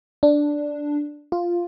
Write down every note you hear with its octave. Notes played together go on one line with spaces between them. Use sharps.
D4
F4